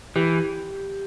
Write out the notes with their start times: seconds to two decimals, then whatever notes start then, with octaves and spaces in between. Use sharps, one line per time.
0.16 E3 G4